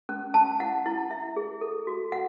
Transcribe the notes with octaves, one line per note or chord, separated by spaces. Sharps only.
C#4
C#4 A5
E4 F#5
E4
E4 E5
G#4
A4
F#4
F#5